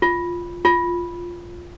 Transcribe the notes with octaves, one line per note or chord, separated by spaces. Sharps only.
F4
F4